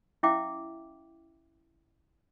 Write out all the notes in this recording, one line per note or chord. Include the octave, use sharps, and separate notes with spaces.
C#4 E4 E5 F5 G5 D6